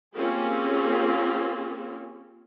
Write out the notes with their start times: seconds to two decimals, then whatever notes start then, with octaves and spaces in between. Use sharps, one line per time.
0.17 A#3 C4 C#4 F4 G4 G#4